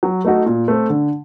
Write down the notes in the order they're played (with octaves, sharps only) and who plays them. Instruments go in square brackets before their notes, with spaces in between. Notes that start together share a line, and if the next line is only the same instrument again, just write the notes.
[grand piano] F#3
A3 D#4 F#4
A#2
A3 C4
D3